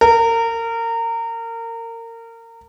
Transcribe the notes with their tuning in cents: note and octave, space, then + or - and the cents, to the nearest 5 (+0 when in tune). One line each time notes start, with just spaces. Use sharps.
A#4 -25